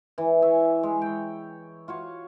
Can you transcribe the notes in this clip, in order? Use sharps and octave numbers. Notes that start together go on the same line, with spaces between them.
E3
C#5 E5 G#5
G#3
C#5 G5
F4 F#4 C#5